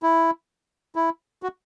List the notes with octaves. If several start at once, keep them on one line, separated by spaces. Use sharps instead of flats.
E4
E4
F#4